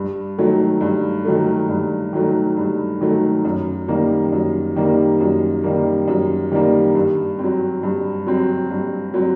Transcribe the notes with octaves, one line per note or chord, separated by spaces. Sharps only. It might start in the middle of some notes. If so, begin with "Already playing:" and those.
Already playing: G2
D#3 F#3 A3
G2
D#3 F#3 A3
G2
D#3 F#3 A3
G2
D#3 F#3 A3
F#2
D#3 G3 A#3
F#2
D#3 G3 A#3
F#2
D#3 G3 A#3
F#2
D#3 G3 A#3
G2
F#3 C4
G2
F#3 C4
G2
F#3 C4